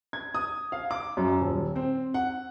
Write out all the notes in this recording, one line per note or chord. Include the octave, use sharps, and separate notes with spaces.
G#6
D#6
F5
D6
F#2
D#1
C4
F#5